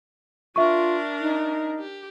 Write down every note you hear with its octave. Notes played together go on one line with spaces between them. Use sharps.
D4 F4 A#4 E5 C#6
D#4
G4